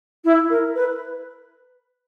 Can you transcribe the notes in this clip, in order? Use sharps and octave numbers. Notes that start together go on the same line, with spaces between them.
E4
A#4
B4